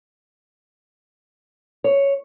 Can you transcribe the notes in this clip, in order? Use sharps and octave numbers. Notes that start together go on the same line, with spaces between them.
C#5